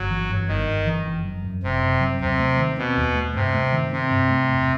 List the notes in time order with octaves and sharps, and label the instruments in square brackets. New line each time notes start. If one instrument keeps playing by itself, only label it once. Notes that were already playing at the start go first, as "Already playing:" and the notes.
Already playing: [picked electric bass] G1 [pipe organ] F#3
[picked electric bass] E3
G2
[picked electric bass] G1 [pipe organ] D#3
[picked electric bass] G1
E3
F#1
F#3
F#2
[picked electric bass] F#1 [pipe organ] C3
[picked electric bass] F#1
F#3
[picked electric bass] D#2 [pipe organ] C3
[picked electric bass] A3
D#3
[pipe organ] B2 [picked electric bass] C4
[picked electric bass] D#2
A3
[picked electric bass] G2 [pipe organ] C3
[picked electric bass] A3
D#3
[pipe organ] C3 [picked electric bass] C4
[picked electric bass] G2
A3
E1